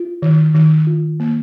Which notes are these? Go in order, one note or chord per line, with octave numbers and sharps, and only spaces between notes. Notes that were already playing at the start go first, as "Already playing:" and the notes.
Already playing: F4
D#3
D#3
F4
A#3